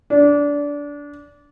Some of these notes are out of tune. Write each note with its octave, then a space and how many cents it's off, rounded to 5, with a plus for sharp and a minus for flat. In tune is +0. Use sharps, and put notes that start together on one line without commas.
D4 -20